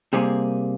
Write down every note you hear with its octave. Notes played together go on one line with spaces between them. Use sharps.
C3 G3 A#3 G#4